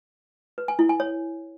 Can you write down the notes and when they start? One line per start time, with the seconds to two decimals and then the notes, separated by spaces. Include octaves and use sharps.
0.58 B4
0.68 G#5
0.79 E4
0.89 G#5
1.00 C#5